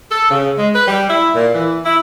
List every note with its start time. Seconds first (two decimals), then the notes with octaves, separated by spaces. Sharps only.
0.11 A4
0.31 C#3
0.58 G#3
0.75 B4
0.88 G3
1.10 E4
1.35 A#2
1.54 E3
1.85 E4